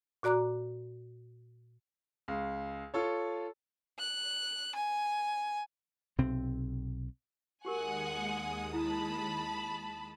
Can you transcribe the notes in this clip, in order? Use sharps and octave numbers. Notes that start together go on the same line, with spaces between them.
A#2 F#4 D5 A#5 D6 F#6
C#2
F4 A4 C#5
F#6
G#5
B1 C3 C4
D#2 G#3 F#4 G4 A#4 F#5 G#5 D#6
E4 A5 B5